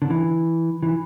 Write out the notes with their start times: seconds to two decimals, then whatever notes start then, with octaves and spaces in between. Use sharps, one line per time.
0.02 D3
0.10 E3
0.83 E3